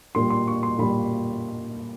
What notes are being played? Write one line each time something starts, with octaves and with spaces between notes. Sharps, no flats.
A#2 G3 C6
C6
C#6
C6
A#2 G3 B5